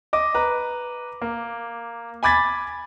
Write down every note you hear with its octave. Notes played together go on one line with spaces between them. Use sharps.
D#5 D6
B4 A#5
A#3
G#5 B5 D6 G#6 A6 B6